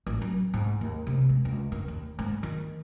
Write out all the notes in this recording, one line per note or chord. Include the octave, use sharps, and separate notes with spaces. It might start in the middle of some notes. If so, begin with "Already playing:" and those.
A1
F#3
G#2
D#2
C3
G#3
C#2
D#3
D#2
G#2
D#3